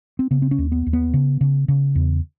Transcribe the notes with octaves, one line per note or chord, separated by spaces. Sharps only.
C4
C#3 B3
C4
C#4
D#2
B3
D#2
B3
C#3
C#3
C#3
E2